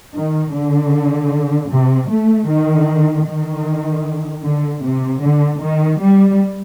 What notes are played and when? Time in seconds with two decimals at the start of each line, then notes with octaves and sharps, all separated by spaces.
0.15 D#3
0.55 D3
1.71 C3
2.11 A3
2.49 D#3
3.27 D#3
4.44 D3
4.84 C3
5.21 D3
5.61 D#3
6.00 G3